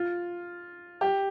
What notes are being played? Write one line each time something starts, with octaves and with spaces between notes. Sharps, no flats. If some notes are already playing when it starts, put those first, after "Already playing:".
Already playing: F4
G4